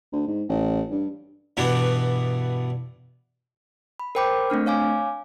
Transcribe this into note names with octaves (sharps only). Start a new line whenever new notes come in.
D2
G#2
A1
G2
G2 B2 E3 B3 D4
B5
A#4 C5 G5 B5 D6 G6
A3 C4 D4 F6
C#5 F5 G#5 D6